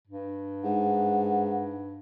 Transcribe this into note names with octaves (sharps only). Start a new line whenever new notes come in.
G2
G#2 F#5